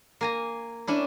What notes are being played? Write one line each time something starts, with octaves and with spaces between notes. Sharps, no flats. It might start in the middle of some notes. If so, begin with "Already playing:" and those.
A#3 G#5 A#5
C#4 D4 E4